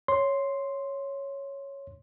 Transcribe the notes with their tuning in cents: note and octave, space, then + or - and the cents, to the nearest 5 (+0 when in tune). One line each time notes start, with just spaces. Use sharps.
C#5 +0 C6 +0